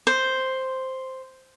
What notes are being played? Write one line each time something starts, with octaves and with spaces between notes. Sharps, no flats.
C5